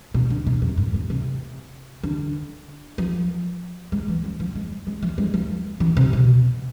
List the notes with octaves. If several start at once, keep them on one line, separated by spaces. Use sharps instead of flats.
B2
D3
B2
F2
G#2
A2
C3
D3
F3
G#3
E3
F3
F3
G#3
G#3
F3
G#3
F3
E3
C3
B2